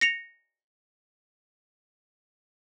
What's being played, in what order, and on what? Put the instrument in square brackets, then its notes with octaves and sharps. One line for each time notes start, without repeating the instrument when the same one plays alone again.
[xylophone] A#6 C#7 F7